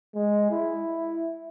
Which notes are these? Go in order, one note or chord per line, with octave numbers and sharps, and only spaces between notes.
G#3
E4